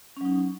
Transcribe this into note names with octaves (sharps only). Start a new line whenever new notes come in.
F#3 C#4 D#4